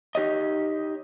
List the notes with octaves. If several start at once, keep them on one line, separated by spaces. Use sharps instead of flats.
D#4 G4 C#5 D#5